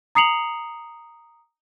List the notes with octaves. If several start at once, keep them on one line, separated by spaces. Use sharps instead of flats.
A#5 D#6 C7 C#7 F7 F#7